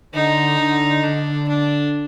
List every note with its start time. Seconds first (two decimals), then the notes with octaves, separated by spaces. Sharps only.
0.14 D3 D#4
0.59 D3
1.04 D3 D4
1.48 D4